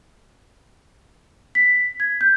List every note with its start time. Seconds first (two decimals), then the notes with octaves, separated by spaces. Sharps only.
1.55 B6
2.00 G#6
2.21 G6